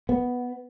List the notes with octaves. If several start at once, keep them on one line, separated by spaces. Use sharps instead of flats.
B3